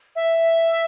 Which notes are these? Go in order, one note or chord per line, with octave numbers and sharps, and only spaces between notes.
E5